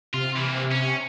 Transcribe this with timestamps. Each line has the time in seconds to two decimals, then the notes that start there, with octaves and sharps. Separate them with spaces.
0.14 C3 F4
0.36 E3 A#3
0.72 C#4